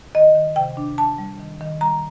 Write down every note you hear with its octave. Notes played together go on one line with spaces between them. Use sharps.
D#3 D#5
D#3
C3 G5
D4
D4 A5
G3
D#3
D#3
G3 A#5